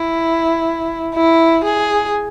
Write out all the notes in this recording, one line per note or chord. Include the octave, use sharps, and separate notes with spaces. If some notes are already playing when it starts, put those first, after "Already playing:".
Already playing: E4
E4
G#4